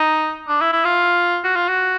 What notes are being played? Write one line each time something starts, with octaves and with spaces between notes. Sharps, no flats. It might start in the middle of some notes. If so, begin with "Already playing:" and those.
Already playing: D#4
D4
E4
E4
F4
F#4
F4
F#4